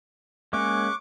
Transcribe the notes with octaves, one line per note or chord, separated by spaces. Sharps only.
G#3 A#3 C#4 C#6 D6 F#6